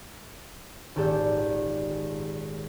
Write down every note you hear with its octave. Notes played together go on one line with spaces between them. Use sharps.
D#1 G#1 G4 A4 D5 G6